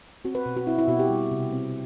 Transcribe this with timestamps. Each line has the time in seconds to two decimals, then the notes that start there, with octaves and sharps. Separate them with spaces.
0.25 C4 F#4
0.35 B4
0.46 B2
0.57 F#4
0.67 C4 E4
0.78 E4
0.88 B2 F#4
0.99 G4
1.10 G3
1.31 C3
1.52 C4